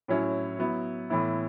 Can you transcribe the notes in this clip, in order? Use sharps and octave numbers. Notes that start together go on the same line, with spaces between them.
A2 F#3 C#4 E4
F#3 B3 E4
A2 E3 B3 E4